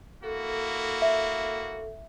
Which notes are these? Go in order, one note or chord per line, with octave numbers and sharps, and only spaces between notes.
A#3 E4 F#4 A4
E5